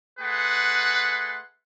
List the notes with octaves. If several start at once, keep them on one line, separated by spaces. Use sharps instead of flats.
A3 G#4 B4 F#5 C6